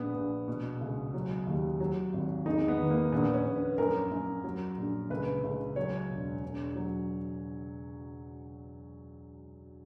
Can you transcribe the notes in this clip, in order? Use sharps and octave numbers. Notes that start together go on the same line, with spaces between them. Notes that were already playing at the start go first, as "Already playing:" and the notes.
Already playing: A#1 B3
A#1
B2
C#2
F#3
D#2
F#3
G#1
E2 D#4
B3
D#3
A#3
A#1 B3
C#4
A#1
B4
F#2 A#4
F#2
F#3
A#1
C#2 B4
C#2
F#3 C#5
E1
E1
F#3